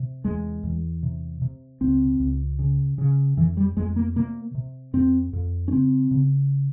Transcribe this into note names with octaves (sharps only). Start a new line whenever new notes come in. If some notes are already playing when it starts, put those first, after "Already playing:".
Already playing: C3
E2 G#3
E2
C3
C3
C#2 C4
C#2
C#3
C#3
F2 E3
G3
F2 G#3
A#3
C3 A#3
C3
F2 C4
F2
C#4
C#3 C4
C#3